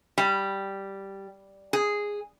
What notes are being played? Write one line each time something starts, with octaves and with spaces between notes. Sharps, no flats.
G3
G#4